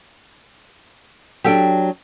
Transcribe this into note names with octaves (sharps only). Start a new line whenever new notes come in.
F#3 D4 G4 A4 G5